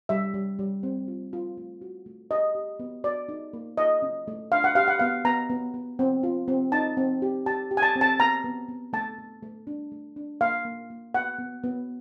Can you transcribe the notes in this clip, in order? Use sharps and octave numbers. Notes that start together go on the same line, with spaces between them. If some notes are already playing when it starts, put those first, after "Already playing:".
G3 E5
G3
G3
C4
F4
F4
A3
F#4
A3
G4 D#5
G4
B3
F#4 D5
D#4
A#3
F4 D#5
C#4
A3
D4 F5
F#5
G4 F5
F#5
B3 F5
B3 A#5
B3
B3
C4
F4
C4
D#4 A5
C4
G4
G4 A5
G4
G#5
A5
C4
A5
B3 A#5
B3
B3
A3 A5
A3
A3
D4
A3
D4
A#3 F5
A#3
A#3
B3 F#5
B3
B3